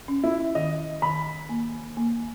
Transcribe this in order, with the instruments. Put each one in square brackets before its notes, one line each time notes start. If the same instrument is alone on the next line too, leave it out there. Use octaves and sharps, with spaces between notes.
[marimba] C#4
[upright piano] E4
[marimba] D#3 [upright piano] D#5
[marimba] D#3 [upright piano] B5
[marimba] A#3
A#3